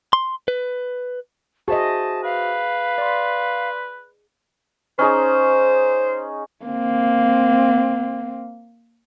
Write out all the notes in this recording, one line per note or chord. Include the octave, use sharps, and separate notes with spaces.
C6
B4
F#4 G#4 C5 D#5 E5 A5
B4 F5
D5 C6
C#4 D#4 G#4 C5
A#3 C4